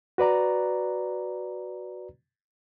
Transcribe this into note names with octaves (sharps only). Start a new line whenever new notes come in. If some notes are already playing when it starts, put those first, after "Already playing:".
F#4 B4 D5 A#5